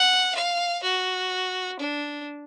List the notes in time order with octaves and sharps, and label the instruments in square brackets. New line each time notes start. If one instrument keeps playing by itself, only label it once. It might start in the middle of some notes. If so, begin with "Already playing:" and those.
Already playing: [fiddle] F#5
F5
F#4
D4